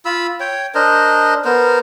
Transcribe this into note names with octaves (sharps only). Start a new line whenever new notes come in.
F4 B5 E6
C#5 G5
D4 A#4 C5 D#5
B3 A#4 C5